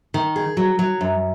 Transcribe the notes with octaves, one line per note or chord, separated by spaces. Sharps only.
D#3
G#4
F#3
F#3
F#2